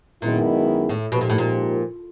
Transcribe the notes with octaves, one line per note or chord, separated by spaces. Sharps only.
F#2 A#2 D#3 G#3 B3 E4
A2
G#2 B2 F3 A#3 D#4 G4
A#2
A2
A#2